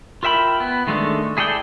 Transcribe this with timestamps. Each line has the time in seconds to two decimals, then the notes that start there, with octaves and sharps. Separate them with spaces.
0.23 F4 A#4 E5 G5 B5
0.60 B3
0.87 D#3 G#3 A3 D4
1.37 E4 G#4 A4 D5 G5